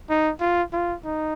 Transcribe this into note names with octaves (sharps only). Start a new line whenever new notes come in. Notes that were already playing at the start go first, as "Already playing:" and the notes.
D#4
F4
F4
D#4